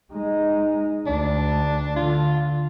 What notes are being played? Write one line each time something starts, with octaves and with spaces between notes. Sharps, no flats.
G#3 D#4
D2 D4
D3 F4